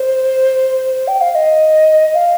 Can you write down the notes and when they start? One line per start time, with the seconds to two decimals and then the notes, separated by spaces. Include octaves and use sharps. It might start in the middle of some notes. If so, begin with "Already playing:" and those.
Already playing: C5
1.07 G5
1.21 F5
1.35 D#5
2.14 F5